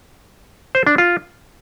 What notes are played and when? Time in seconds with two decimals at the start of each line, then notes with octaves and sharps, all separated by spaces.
0.75 C5
0.87 D4
0.98 F4